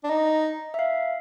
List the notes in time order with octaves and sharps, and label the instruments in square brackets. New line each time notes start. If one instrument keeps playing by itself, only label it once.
[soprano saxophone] D4
[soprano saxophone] D#4 [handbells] D#5
[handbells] E5
F5